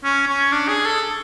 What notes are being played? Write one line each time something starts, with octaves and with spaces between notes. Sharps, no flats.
C#4
C#4
D4
G#4
A4